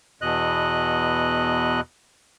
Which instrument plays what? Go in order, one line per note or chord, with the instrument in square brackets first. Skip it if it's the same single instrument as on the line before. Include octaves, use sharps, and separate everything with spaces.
[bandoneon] E2 B2 D#5 F#6